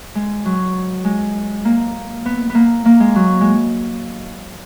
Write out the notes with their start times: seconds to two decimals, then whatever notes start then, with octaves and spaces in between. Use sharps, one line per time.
0.15 G#3
0.45 F#3
1.05 G#3
1.65 A#3
2.26 B3
2.50 B3
2.55 A#3
2.85 A#3
3.00 G#3
3.15 F#3
3.41 G#3